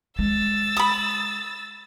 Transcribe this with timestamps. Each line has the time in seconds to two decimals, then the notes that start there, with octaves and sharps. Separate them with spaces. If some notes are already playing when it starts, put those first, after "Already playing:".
0.19 G#3 E6 A6
0.77 B5 D#6